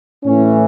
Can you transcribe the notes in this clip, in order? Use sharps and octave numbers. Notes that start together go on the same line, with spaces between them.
A2 E3 C#4